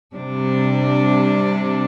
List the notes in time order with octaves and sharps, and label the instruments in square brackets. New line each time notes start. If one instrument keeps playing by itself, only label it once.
[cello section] C3 G3 D4